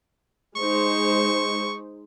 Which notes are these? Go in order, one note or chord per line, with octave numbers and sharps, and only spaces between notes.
G#3 D#4 C5 C#6